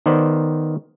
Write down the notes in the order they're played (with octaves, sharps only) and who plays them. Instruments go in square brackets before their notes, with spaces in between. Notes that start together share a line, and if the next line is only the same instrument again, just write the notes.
[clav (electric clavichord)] D#3 B3 C5 D5